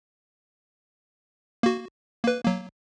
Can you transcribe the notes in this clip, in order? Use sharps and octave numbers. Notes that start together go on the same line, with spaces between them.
A#3 F#4
A#3 B4
F#3 A#3